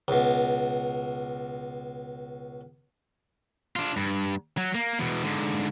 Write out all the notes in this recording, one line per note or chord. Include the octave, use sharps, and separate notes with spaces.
C#2 B2
D4 F4
G2
F#3
A#3
E2 B2
G#2 D3